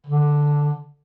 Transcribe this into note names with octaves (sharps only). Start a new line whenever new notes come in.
D3